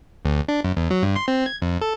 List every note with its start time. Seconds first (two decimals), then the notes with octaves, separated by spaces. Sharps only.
0.25 D2
0.48 D4
0.65 F#2
0.77 E2
0.91 F#3
1.02 G2
1.16 C6
1.28 C4
1.46 G#6
1.62 F2
1.81 A4